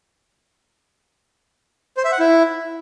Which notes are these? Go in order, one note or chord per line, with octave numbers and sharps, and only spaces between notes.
C5
E5
F#5
E4